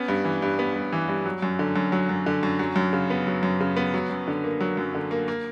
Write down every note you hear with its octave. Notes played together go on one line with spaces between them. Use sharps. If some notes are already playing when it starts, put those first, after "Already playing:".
Already playing: B3 C#4
G2
E3
G2
B3
G2
E3
G2
F#3
F#2
D3
F#2
F#3
F#2
D3
F#2
F#3
F#2
C#3
B3
F#3
F#2
C#3
B3
F#3
F#2
D3
A#3
F#3
F#2
D3
A#3
A#3